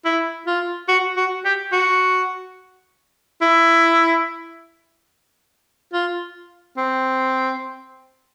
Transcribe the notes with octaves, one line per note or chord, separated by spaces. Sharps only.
E4
F4
F#4
F#4
G4
F#4
E4
F4
C4